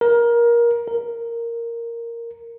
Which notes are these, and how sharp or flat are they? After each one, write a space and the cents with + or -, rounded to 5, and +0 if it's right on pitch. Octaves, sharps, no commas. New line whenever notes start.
A#4 +20
A#4 -5